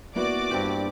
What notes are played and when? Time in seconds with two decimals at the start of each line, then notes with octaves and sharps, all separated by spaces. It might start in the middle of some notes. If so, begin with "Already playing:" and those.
0.15 A#3 B3 E4 F#4 D5 D6
0.51 G2 C4 G4